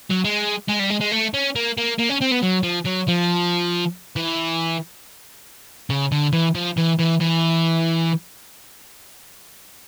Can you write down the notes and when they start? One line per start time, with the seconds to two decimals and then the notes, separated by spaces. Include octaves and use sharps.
0.11 F#3
0.25 G#3
0.69 G#3
0.80 G3
0.90 G#3
1.01 G#3
1.12 A3
1.34 C#4
1.55 A#3
1.77 A#3
1.99 A#3
2.09 C#4
2.21 C4
2.31 B3
2.42 F#3
2.63 F3
2.86 F#3
3.08 F3
4.16 E3
5.90 C#3
6.12 D3
6.33 E3
6.55 F3
6.77 E3
6.99 E3
7.20 E3